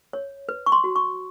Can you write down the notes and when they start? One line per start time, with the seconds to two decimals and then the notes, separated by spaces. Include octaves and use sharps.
0.13 C#5
0.49 B4
0.66 C#6
0.72 C6
0.84 F#4
0.96 C#6